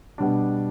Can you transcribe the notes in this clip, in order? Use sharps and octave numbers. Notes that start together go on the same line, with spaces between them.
B2 G3 D4